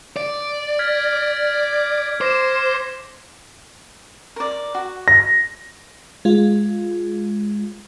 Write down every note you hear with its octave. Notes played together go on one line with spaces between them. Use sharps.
D5 D7
F6 G#6 B6
G#6
C5 D6 A#6 E7
A#4 D5
F#4
A#6
G#3 F4